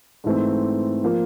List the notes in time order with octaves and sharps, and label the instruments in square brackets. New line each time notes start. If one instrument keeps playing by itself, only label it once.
[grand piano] G#2 E3 A3 C4
F3 A#3